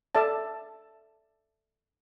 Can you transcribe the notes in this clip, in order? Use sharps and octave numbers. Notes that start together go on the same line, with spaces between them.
A4 D5 E5 A5